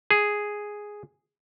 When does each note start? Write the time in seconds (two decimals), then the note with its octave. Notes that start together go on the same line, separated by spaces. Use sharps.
0.11 G#4